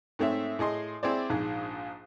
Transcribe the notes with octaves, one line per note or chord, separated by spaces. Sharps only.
G#2 A3 C4 C#5 E5
A2 G#4 D#5 C6
C4 E4 G#4 C5 D5
A#1 G#2 G#4